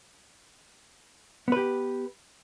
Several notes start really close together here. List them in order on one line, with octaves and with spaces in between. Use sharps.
B3 B4 G4